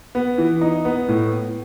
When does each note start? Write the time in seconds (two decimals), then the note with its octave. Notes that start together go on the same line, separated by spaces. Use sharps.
0.15 B3
0.38 E3
0.61 D#4
0.85 B3
1.08 A2